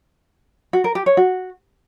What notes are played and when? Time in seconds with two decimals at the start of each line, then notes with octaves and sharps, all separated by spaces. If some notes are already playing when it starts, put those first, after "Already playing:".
0.73 F#4
0.84 A#4
0.95 G4
1.06 C#5
1.17 F#4